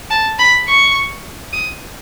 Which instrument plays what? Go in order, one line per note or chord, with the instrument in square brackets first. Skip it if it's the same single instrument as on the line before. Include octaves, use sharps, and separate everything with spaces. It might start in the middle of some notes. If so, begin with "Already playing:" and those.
[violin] A5
B5
C#6
D#6